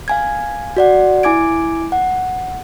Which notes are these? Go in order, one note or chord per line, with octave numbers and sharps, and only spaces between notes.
F5 G#5 G#6
F#4 D5 F#5
E4 G#5 D6 G#6 D7
F#5